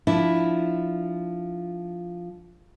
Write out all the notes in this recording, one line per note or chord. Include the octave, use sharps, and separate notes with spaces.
F3 D4 E4